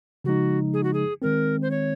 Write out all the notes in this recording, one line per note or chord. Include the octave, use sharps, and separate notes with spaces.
C#3 F3 G#3 D#4 F#4
G#4
F#4
G#4
D#3 G#3 C4 A#4
C5
C#5